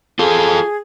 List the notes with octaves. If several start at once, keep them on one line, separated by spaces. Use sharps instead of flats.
F4 G#4 A4